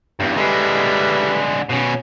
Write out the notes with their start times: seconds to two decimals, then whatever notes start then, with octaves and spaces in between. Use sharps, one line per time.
0.20 E2 G2
0.37 D3 G3 G#3 B4 E5
1.70 B2 C#4